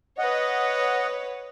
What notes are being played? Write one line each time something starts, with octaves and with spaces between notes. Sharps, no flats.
B4 C#5 D#5 F#5